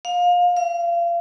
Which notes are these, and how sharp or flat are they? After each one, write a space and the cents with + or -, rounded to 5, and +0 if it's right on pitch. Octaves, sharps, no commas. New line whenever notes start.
F5 +25
F5 -30